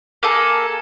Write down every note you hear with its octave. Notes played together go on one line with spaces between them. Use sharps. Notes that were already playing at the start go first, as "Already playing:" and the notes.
A#3 G#4 A4